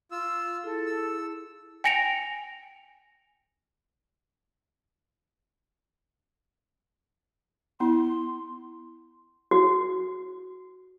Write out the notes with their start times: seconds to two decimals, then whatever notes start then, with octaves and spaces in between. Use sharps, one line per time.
0.11 F4 E6
0.64 E4 G#4 A4
0.86 E6
1.84 G5 G#5 A#6 C#7 D7 F7
7.80 B3 E4 C6
9.51 F#4